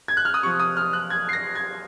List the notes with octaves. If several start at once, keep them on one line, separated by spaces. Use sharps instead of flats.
G#6
F#6
F6
D#6
C3 F3 C#6
D#6
F6
F#6
G#6
C7
A#6
G#6